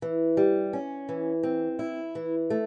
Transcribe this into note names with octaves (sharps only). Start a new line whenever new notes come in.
E3
G3
C#4
E3
C4
E4
E3
A3